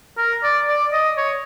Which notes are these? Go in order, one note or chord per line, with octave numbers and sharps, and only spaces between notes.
A#4
D5
D5
D#5
C#5